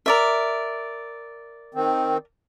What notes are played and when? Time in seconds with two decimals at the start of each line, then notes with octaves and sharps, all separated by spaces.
0.06 A#4 D5 E5
1.74 D#3 C4